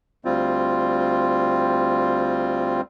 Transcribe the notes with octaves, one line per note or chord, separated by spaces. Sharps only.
D2 G3 C4 F4